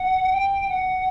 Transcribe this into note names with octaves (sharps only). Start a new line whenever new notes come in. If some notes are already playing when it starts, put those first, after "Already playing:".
Already playing: F#5
G5
F#5